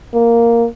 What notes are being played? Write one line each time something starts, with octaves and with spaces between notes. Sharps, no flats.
A#3